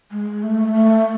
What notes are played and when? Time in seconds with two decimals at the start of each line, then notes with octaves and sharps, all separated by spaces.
0.12 G#3
0.43 A3
0.74 A3